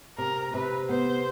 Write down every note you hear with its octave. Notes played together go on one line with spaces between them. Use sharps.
C3 A#4
C3 B4
B3 C5